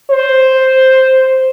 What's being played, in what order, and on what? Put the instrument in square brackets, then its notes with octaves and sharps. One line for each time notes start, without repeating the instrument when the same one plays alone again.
[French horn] C5